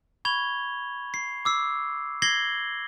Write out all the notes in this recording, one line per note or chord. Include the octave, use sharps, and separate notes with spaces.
B5 C#6 G#6 F7 G7
C7
D6 E6 C7
G#6 A#6 C7 F#7 G7